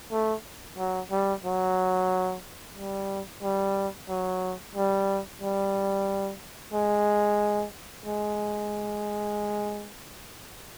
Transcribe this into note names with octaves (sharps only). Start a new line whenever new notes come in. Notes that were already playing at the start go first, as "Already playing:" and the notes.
A3
F#3
G3
F#3
G3
G3
F#3
G3
G3
G#3
G#3